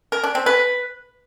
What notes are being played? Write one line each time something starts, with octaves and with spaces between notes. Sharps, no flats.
A#4
D4
C4
B4